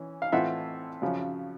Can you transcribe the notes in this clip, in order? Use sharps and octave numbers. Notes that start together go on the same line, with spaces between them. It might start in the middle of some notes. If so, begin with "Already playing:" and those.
Already playing: E3 C#4
F5
A2 E3 A3 C4 F4 E5 F#5
F#2 C#3 F3